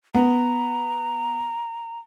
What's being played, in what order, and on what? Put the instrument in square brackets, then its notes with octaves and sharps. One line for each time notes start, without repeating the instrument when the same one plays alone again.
[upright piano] B3 [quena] A#5